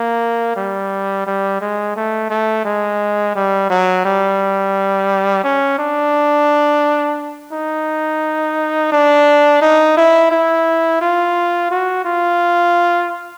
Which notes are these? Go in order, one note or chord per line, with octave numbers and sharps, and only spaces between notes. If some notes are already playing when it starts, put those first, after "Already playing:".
Already playing: A#3
G3
G3
G#3
A3
A3
G#3
G3
F#3
G3
C#4
D4
D#4
D4
D#4
E4
E4
F4
F#4
F4